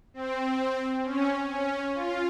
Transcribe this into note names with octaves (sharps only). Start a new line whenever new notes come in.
C4
C#4
C#4
F4